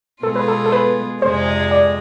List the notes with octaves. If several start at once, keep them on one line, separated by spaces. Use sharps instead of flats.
B2 G#3 B3 F4 G#4 A4
B4
A4
A4
B4
F2 C3 G#3 D4 G#4 C5
D5